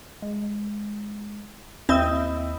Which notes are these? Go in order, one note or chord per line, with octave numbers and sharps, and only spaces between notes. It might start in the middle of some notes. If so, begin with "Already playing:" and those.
G#3
D#2 C4 E4 D#5